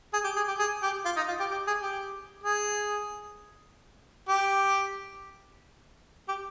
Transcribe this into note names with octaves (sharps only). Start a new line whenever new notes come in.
G#4
G4
G#4
G4
G#4
G4
F4
D#4
F4
G4
G4
G#4
G4
G#4
G4
G4